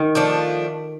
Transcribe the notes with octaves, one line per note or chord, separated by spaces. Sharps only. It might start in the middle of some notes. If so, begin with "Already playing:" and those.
Already playing: D#3
F3 A3 D4